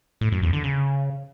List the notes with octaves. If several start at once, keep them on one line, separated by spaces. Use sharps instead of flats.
A2
F#2
E2
D3
C#3